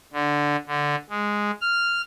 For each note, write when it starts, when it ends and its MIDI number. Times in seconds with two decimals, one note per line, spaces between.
0.13 0.56 50
0.67 0.95 50
1.10 1.51 56
1.61 2.02 89